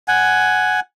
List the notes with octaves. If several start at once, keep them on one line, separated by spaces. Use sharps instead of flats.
F#5 G#5